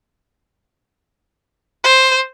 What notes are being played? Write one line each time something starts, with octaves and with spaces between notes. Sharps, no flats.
C5